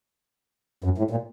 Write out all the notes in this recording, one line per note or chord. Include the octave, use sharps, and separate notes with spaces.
F#2
A2
A#2